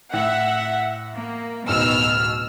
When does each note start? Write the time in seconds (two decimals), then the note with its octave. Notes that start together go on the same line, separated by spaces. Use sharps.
0.13 A2 E5 F#5
1.15 A#3
1.69 D1 B2 D#4 E6 F6